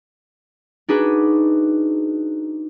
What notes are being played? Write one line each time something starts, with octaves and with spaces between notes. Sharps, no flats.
D4 D#4 F#4 G#4 B4